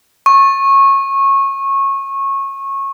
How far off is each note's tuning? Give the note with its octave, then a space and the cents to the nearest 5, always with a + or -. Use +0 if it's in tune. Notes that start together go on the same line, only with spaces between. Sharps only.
C#6 -20